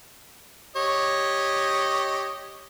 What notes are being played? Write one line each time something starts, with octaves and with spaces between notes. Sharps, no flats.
G4 C#5 D#5